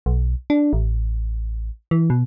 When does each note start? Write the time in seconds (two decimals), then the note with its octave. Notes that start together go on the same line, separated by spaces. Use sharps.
0.06 B1
0.50 D4
0.73 A1
1.91 E3
2.10 B2